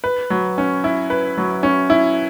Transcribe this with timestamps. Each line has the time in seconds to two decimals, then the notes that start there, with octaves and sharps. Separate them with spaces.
0.04 B4
0.30 F#3
0.58 C#4
0.84 E4
1.10 B4
1.37 F#3
1.63 C#4
1.90 E4